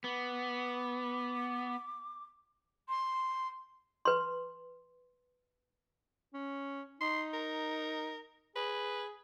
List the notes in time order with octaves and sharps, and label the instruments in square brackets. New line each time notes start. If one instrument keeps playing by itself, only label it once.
[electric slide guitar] B3 [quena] D6
[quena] C6
[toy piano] B4 C6
[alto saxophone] C#4
[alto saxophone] D#4 [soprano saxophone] C6
[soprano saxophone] A#4
[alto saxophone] G#4 [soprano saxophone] B4